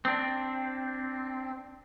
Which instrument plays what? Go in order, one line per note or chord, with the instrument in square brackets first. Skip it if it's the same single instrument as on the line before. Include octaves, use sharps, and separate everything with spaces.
[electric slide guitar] C4 D4